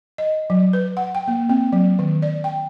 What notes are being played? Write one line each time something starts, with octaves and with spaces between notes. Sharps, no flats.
D#5
F#3
B4
F#5
G5
A#3
C4
F#3
D#3
D5
G5